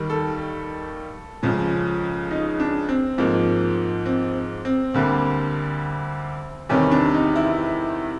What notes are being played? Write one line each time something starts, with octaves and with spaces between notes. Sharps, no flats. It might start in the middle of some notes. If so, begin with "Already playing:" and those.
Already playing: D#2 D#3 G3
A4
C#2 C#3 F3 G#3
D#4
D4
C4
G#2 F3 A#3
C4
C4
D2 D3 G3 A#3
E2 C3 D#3 G3 C#4
D4
D#4
E4